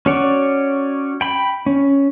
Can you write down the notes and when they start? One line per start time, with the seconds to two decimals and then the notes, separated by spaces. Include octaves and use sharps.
0.06 C#4 F#4 C#5 D5
1.21 G5 B5
1.66 C#4